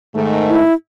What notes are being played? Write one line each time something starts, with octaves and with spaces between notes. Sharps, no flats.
G#2 D#3 A3
E4